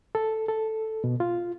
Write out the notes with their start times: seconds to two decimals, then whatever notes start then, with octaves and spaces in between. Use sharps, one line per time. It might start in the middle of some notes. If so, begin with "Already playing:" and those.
0.15 A4
0.48 A4
1.04 B2
1.20 F4